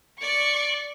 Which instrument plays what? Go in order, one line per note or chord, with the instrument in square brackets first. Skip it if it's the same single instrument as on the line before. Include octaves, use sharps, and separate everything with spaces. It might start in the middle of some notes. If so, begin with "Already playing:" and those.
[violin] D5 C#6